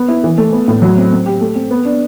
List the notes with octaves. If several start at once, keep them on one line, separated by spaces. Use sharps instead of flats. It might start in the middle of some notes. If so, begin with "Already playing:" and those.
Already playing: B3
E4
E3
A3
B3
A2
F#3
C4
C4
G4
A3
C4
B3
D4